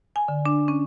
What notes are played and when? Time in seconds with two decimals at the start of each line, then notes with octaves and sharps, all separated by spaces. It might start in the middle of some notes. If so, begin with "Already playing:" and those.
0.16 G#5
0.28 D3
0.46 D4
0.68 C#4